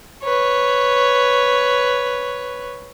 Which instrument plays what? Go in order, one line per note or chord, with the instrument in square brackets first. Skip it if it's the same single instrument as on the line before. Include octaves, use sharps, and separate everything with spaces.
[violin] B4 C#5